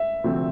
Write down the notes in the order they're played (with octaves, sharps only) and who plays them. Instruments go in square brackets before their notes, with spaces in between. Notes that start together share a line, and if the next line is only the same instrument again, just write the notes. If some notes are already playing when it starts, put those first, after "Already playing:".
Already playing: [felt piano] E5
[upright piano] D2 C3 F3 A3 C4